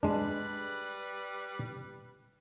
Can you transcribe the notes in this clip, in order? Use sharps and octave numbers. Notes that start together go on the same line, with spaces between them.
G3 G#3 D4 B4